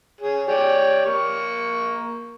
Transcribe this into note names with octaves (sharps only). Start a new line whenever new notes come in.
G#4 C#5
G4 C#5 D5
A#3 C#6